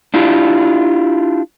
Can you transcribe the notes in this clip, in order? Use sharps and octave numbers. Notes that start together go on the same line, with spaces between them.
D4 E4 F4 G4